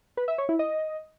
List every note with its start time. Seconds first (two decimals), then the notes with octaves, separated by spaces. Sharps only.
0.17 B4
0.28 E5
0.38 C#5
0.49 E4
0.59 D#5